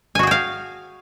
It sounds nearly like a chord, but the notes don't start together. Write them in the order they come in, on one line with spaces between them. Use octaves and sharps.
G#5 F#4 G#4 G5 F5